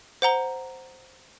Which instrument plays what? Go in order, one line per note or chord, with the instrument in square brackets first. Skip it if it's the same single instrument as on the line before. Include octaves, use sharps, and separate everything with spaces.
[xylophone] C5 F#5 A#5 G7